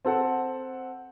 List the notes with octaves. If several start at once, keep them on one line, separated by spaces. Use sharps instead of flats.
C4 A4 F#5